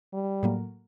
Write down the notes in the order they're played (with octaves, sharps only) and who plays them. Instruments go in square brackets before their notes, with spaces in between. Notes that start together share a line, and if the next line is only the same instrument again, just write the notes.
[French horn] G3
[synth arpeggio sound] A2 F#3 A#3